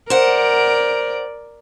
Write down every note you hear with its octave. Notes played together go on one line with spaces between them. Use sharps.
A#4 C5 D5 F#5